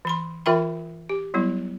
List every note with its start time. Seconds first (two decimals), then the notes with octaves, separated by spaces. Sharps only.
0.05 E3 B5 C6
0.46 E3 F4 A#4 E5 G5 B5
1.09 G4
1.34 F#3 G3 B3 E4